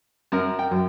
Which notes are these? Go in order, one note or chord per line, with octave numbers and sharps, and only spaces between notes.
F#2 A#4
G5
F#2